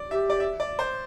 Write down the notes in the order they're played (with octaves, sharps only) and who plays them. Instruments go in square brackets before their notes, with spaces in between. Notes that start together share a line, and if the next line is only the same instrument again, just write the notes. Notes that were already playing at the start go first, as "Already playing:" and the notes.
Already playing: [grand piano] D5
[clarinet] G4 [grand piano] E5
[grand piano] D5
E5
D5
C5